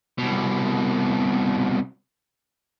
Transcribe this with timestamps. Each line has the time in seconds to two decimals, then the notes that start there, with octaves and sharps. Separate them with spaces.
0.18 C2 B2